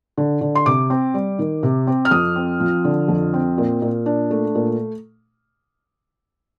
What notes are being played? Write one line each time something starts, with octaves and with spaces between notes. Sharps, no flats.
D3
D3
C6
C3 D6
C4
G3
D#3
C3
C4
F6
F2 D#6
C4
F3
D3
F2
C4
A#2
A#2
D4
A3
A#2